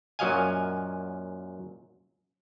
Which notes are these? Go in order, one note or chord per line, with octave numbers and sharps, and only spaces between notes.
F#2 A#2 F#3 D#5 F5 G#5